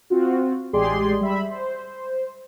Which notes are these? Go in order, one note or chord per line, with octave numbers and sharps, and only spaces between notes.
C4 F4 F#4
A1 G#3 G4 G#4 D5 C6
G3 E5 B5
C5